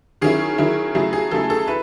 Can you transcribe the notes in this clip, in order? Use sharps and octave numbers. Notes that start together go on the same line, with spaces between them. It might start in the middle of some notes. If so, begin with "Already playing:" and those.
D#3 F#3 C#4 E4 G#4
D#3 F#3 C#4 E4
C#3 F#3 A3 E4 G#4
G#4
C#3 F#3 A3 E4 A4
A4
E4 B4